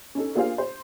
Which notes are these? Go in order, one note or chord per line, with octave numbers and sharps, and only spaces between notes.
C#4 D#4 A4
A#3 D4 F4 G#4 C5 F5
C5